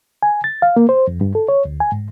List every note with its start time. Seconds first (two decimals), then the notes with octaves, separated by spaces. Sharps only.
0.23 G#5
0.44 A6
0.62 F5
0.77 A#3
0.89 C5
1.08 F2
1.21 G2
1.35 A4
1.48 C#5
1.65 D2
1.80 G#5
1.92 G#2